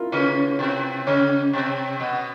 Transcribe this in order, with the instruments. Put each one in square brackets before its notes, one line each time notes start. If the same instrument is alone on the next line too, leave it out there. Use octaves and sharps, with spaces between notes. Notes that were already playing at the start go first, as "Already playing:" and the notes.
Already playing: [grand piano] E4 F4 A#4
[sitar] C#3 C#4 [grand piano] B4
[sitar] C3 C4
[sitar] C#3 C#4 [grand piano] C#5
[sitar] C3 C4
B2 B3